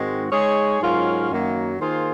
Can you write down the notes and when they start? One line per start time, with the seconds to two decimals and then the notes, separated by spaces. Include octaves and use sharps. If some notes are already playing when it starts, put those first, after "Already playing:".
Already playing: G#2 D#3 G#3 C4 F#4
0.31 G#3 D#4 G#4 C#5
0.80 G#2 F#3 C#4 F4 A#4
1.30 F#2 D#3 F#3 A#3
1.79 D#3 A#3 F4 G#4 C5